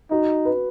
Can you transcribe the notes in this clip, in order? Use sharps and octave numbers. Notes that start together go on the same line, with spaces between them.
D#4 F#4
B4